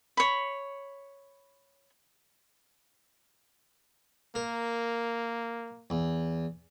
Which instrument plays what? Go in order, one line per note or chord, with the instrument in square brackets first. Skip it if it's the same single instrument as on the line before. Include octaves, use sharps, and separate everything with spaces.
[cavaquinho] C#5 B5
[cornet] A#3 [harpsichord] A#4
[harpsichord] E2